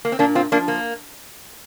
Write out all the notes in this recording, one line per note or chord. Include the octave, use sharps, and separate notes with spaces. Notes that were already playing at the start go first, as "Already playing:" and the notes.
A#3
C4
A#2 A#3 D4
C4 F4
F3 A#3 D4
A#3